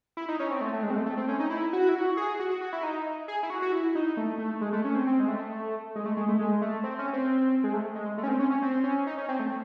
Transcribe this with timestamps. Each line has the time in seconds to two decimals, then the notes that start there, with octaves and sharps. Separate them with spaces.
0.17 E4
0.29 D#4
0.40 C#4
0.51 C4
0.61 A3
0.73 A3
0.83 G#3
0.90 C4
0.95 A3
1.06 A3
1.17 C4
1.28 C#4
1.40 D#4
1.50 E4
1.73 F#4
1.89 E4
1.95 F#4
2.17 G#4
2.40 F#4
2.50 F#4
2.61 F#4
2.73 E4
2.83 D#4
3.28 G#4
3.43 E4
3.50 F#4
3.62 F#4
3.72 E4
3.95 D#4
4.17 A3
4.39 A3
4.61 G#3
4.73 A3
4.84 C#4
4.95 C4
5.07 C4
5.20 G#3
5.28 A3
5.96 G#3
6.06 A3
6.17 G#3
6.28 A3
6.39 G#3
6.62 A3
6.84 C4
6.99 C#4
7.13 C4
7.64 G#3
7.73 A3
7.95 G#3
8.18 A3
8.23 C#4
8.28 C4
8.39 C#4
8.51 C#4
8.62 C4
8.84 C#4
9.07 D#4
9.18 C#4
9.29 C4
9.40 A3